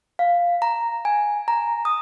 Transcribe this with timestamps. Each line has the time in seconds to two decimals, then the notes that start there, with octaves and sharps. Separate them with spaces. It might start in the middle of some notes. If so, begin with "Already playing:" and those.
0.19 F5
0.62 A#5
1.05 G#5
1.48 A#5
1.85 D#6